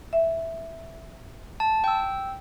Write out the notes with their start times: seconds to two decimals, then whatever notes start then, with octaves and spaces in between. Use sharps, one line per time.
0.13 E5
1.60 A5
1.84 G5 E6